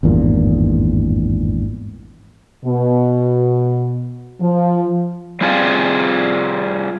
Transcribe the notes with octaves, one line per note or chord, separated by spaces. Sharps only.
G#1 E2 G2 A#2
B2
F3
G3 C4 F4 G#4 D5 F5